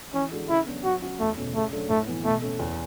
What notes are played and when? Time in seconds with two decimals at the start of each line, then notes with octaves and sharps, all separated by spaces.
0.14 E3 C#4
0.32 G#3 D4 F#4 A4
0.49 C#3 E4
0.67 F#3 B3 D4
0.84 F#3 F#4
1.01 C#4 F#4
1.20 E2 A3
1.37 B2 A3 C#4
1.54 C#3 A3
1.72 F#3 A3 D4
1.89 A2 A3
2.07 E3 B3
2.24 B2 A3
2.42 A3 C#4
2.59 E2